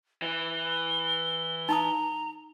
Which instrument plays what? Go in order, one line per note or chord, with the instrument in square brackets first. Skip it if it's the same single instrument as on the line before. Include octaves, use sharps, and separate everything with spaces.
[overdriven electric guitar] E3 [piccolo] G7
[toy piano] D#4 A5 D#6 [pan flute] A#5